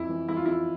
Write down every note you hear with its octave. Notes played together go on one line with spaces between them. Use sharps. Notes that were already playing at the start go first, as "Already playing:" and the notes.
Already playing: F2 E4
E3
E3 E4
F4
F2 E4